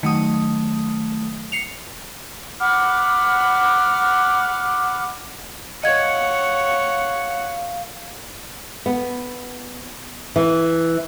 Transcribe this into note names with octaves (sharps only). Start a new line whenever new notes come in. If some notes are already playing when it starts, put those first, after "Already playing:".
D#3 F#3 A3 D#6
C7 C#7 F7
F#5 B5 D6 F6
C#5 D#5 F5 F#5 G#6
B3
E3